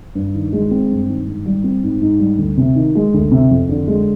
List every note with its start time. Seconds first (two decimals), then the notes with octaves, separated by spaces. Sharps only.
0.15 G2
0.34 D#3
0.53 G#3
0.71 C4
0.90 G2
1.08 D#3
1.26 G#2
1.46 G3
1.64 C4
1.83 G#2
2.01 G#2
2.20 G3
2.38 D2
2.57 C3
2.75 D#3
2.95 G#3
3.14 D2
3.31 C3
3.51 F2
3.69 D3
3.87 G#3